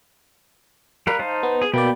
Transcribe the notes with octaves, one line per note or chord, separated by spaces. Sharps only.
G3 A#4 B4 F5
D#4 C5 A5
B3
G#4
B2 A#3 D5 G5 B5